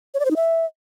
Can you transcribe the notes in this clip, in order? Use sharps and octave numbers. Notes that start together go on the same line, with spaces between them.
C#5
D5
C5
D#4
E5